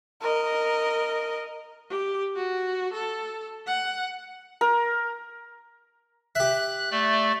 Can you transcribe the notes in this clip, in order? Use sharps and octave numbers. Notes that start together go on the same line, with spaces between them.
A#4 D#5
G4
F#4
A4
F#5
A#4
G4 E5 F#6
A3 D5